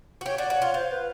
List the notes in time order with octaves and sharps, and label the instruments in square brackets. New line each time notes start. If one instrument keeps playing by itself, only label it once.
[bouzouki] F#4
[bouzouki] G4 [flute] C#5
[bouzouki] F#4 [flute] D5
[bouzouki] F#4 [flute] C#5
[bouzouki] F4
[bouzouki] F4 [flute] C5
[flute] B4